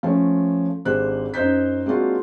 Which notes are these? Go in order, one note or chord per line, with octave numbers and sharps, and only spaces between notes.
F3 A3 C#4
G#1 D3 G#3 G4 C5 F#6
F#2 D#4 C5 G6 B6
G#3 A#3 C4 D4 F4 F#4